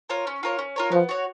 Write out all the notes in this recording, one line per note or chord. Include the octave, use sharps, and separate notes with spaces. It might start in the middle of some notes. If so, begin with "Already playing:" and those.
F4 A#4 C#5
C#4
F4 A#4 C#5
C#4
F4 A#4 C#5
F3 B3
F#4 C#5